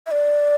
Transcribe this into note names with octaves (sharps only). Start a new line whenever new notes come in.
E5
D5